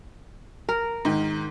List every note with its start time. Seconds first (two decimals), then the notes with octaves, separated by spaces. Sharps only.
0.69 A#4
1.05 G#2 D#3